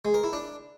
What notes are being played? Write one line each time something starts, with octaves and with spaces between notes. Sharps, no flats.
G#3
A#4
E4
D4